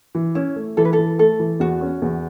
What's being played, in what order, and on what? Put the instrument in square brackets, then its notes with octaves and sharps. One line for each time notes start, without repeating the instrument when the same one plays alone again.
[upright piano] E3
[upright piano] C#4 [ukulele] E4
[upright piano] A3
[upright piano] E3 [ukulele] A4
[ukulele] B4
A4
[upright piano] E3
[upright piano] A3 [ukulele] A4
[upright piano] E3
[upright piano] E2 [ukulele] F#4
[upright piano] C#4
E2